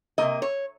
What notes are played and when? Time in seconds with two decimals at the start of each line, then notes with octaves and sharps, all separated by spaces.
0.18 C3 F3 A#3 D#5
0.42 C#5